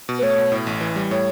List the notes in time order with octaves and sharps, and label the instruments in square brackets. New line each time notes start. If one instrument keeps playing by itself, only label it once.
[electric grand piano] B2
[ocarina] B4
[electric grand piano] A3 [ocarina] C#5
[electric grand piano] B2
A2
A1
E3
G3
[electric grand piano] A2 [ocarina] C#5